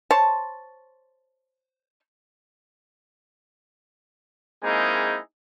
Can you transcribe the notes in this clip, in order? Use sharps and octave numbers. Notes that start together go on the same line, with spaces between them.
C5 C#5 A5
G#3 A#3 C4 D#4 E4 G#4